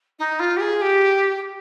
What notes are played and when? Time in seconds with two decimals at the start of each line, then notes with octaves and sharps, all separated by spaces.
0.19 D#4
0.39 F4
0.56 G4
0.60 G#4
0.81 G4